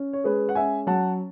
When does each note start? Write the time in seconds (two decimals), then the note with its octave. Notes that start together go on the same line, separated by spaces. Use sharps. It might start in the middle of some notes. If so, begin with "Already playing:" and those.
Already playing: C#4
0.13 C#5
0.24 G#3 G#4 B4
0.49 F#5
0.55 C#4 E5 G#5
0.87 F#3 F#5 A5